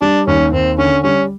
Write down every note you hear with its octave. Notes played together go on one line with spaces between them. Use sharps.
G3 D4
D#2 C#4
D#2 C4
D3 C#4
G3 C#4